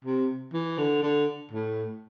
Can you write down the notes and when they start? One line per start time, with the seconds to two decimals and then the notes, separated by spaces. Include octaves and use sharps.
0.04 C3
0.53 E3
0.78 D3
1.02 D3
1.51 A2